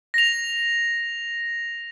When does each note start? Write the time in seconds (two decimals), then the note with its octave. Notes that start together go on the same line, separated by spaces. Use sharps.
0.14 A#6 F7